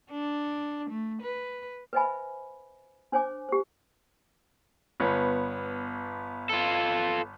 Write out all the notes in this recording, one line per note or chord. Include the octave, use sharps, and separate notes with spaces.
D4
A3
B4
B4 C5 D#5 E5 G#5 B5
D4 C5 C#5 G#5 D6
G4 C5
G1 B3 C#5
F4 A4